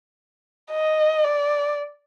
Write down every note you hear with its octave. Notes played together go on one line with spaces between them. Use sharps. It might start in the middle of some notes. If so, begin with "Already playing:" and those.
D#5
D5